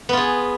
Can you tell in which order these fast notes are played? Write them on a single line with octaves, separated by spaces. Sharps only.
B3 F4 G#4